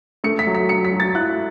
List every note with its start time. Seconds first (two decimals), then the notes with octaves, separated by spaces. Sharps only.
0.24 A3 C#7
0.39 B6
0.47 F#3
0.55 B6
0.69 F#3 C#7
0.85 B6
0.92 F#3
1.00 A6
1.14 E4 F#6